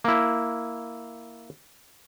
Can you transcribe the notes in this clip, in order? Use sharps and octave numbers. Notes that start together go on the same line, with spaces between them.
A#3 E4